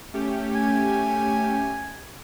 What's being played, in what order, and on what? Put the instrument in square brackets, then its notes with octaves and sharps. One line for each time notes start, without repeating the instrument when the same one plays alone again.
[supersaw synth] A3 C#4 G4
[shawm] G#5